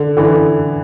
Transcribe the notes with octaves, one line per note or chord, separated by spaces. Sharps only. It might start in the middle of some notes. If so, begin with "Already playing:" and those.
Already playing: D3
D3 E3